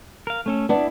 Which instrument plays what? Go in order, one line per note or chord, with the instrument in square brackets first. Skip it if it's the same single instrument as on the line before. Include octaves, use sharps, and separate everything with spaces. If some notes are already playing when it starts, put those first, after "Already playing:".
[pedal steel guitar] A#4 F5
A3 C#4 A4
[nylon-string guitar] B3 D4 [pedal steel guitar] E4